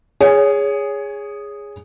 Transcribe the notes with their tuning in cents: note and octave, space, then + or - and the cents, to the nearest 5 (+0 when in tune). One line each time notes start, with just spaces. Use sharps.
G#4 -10 C#5 +15